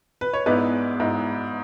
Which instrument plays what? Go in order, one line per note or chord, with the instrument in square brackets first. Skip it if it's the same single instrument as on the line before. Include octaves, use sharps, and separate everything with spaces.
[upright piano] B4
C#5
G#2 G#3 B3 E4 B4 D5
G#2 G#3 B3 E4